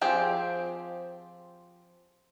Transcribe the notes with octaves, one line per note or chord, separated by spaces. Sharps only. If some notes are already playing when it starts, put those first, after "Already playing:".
F3 C4 G4 G#4